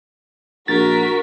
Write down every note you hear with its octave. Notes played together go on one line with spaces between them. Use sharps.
A#1 F#4 A#4 A6 B6